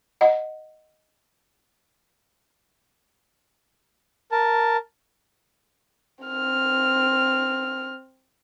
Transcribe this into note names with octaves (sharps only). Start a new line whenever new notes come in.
D#5 F#5
A#4 A5
C4 F6